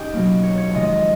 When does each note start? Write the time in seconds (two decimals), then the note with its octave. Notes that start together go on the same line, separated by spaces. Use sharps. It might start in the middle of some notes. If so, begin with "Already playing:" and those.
Already playing: C#4 D#4 G4
0.14 B2 F#3 A#3
0.43 C#5
0.58 C#5
0.71 F2 C3 D#3 G#3 D#5
0.88 D#5